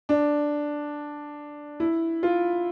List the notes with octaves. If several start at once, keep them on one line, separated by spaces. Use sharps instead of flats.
D4
E4
F4